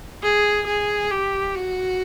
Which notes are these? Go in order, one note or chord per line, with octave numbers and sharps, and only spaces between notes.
G#4
G#4
G4
F#4